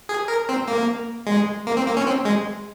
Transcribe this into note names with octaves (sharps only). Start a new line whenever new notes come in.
G#4
A#4
C4
A#3
G#3
A#3
C4
A#3
C#4
C4
G#3